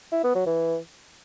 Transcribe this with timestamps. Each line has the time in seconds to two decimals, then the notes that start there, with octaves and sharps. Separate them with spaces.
0.12 E4
0.24 B3
0.35 F#3
0.46 E3